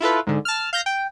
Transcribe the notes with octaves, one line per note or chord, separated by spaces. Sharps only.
E4 F4 A4 B4
G#2 D3
A5 F6
F5 G6 A#6
G5